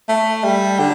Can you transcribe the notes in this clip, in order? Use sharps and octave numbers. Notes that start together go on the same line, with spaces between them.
A3
G3
D3